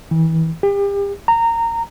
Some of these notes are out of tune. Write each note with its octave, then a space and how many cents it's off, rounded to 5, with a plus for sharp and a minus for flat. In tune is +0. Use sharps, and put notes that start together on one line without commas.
E3 -30
G4 +35
A#5 -20